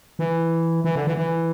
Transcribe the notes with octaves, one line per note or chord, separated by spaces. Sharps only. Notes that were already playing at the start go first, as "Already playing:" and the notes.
E3
E3
D3
E3
E3